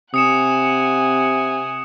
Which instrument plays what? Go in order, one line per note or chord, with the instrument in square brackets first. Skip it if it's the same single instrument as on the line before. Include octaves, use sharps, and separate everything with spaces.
[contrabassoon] C3 [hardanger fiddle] F#5 G#5 [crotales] D#6 C#7 E7